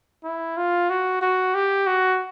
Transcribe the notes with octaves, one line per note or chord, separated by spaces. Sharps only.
E4
F4
F#4
F#4
G4
F#4